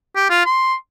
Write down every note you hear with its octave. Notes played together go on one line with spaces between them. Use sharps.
G4
F4
C6